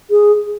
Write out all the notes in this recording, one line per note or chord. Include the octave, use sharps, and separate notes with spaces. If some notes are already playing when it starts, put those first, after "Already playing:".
G#4